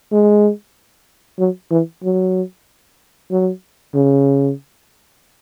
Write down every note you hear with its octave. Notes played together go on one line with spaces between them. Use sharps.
G#3
F#3
E3
F#3
F#3
C#3